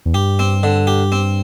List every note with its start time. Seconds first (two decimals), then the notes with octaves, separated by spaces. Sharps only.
0.06 E2
0.14 G2 G4
0.39 C4
0.63 D3
0.87 G4
1.12 C4